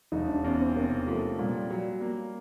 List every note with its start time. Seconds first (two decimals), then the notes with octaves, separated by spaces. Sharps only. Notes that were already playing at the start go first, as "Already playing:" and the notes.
0.12 E1 D#4
0.28 D4
0.43 E2 C#4
0.60 C4
0.75 C3 A#3
1.06 F3 A3
1.39 A#2 G3
1.70 F#3
2.01 A#3